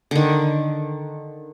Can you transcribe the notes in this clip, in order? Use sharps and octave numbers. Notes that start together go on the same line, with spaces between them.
D3 D#3